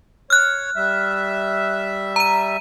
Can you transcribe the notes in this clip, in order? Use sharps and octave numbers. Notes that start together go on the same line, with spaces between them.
C#5 F6 F#6
G3 E5
A#5 D#7